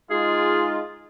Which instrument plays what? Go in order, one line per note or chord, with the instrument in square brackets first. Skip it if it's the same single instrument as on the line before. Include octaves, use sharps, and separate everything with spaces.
[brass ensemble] G#3 D#4 F4 [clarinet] G#4